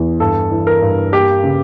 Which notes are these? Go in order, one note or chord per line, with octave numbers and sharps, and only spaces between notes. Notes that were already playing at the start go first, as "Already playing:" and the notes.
Already playing: E2
G2 A4
E3
A#4
G2
A#3 G4
C#3